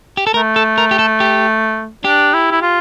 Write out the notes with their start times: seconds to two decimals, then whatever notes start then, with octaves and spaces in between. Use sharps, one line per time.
0.17 G4
0.27 A4
0.34 A3 A#4
0.56 A4
0.78 A#4
0.91 G4
0.99 A4
1.20 G4
2.05 D4 G4
2.33 E4
2.51 E4
2.62 F4